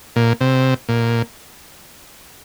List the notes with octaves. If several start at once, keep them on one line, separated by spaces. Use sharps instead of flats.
A#2
C3
A#2